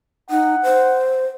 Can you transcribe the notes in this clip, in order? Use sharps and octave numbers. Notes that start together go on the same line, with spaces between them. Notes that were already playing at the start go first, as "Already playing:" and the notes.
D#4 F#5
C5